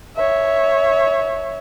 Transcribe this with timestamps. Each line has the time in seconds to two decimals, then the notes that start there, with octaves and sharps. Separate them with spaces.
0.16 C#5 E5